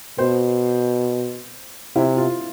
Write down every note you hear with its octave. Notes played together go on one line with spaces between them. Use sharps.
B2 C5
C3 E4
F4